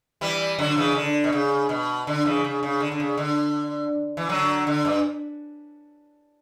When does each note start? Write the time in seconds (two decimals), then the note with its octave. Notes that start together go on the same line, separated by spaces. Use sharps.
0.21 E3 G3
0.59 D3 F#3
0.77 C#3 E3
0.95 D3
1.24 B2
1.33 C#3
1.69 B2
2.07 D3
2.25 C#3 E3
2.44 C#3
2.63 C#3
2.80 D3
2.92 D3
3.00 C#3
3.18 D3
4.17 E3
4.29 D3 F#3
4.67 D3
4.85 G2